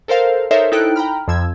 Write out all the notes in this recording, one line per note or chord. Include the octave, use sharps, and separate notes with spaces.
A4 A#4 C5 F5
D#4 A4 A#4 C5 C#5 E5
D#4 E4 A4 G5 F#6 D7
G5 A#5 B5 F6
F2 F3 E6 G#6